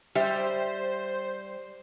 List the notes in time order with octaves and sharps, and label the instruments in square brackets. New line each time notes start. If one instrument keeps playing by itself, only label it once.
[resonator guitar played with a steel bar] G3 E5 [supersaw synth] C5